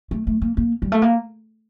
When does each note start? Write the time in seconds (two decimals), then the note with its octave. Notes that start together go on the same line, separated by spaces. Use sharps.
0.11 A3
0.27 A3
0.42 A#3
0.57 A#3
0.82 G3
0.92 A3
1.02 A#3